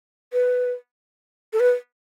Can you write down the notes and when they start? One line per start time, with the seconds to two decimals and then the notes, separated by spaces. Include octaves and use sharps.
0.33 B4
1.53 A4
1.60 B4